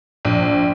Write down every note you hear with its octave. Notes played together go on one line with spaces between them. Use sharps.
A#1